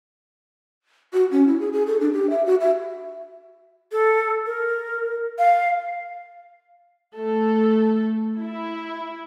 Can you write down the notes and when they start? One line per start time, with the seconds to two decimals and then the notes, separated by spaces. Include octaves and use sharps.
1.13 F#4
1.31 C#4
1.47 E4
1.60 G#4
1.73 G#4
1.87 A4
2.01 D4
2.13 G4
2.30 E5
2.46 F#4
2.61 E5
3.92 A4
4.46 A#4
5.39 F5
7.16 A3 A4
8.39 E4